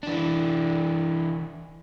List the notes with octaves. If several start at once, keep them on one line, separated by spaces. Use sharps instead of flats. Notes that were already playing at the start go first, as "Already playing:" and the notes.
E3 D4